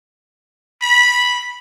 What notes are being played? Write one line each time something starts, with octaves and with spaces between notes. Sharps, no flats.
B5